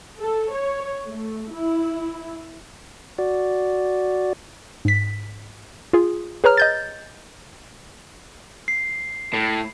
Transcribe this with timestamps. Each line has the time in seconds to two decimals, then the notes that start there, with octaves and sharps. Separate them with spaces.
0.20 A4
0.54 C#5
1.07 A3
1.54 E4
3.18 F#4 D5
4.85 G#2 B6
5.93 F4 G#4
6.44 G#4 B4 C#5 A#5 F6
6.57 D#5 G6 A6
8.68 C7
9.34 A2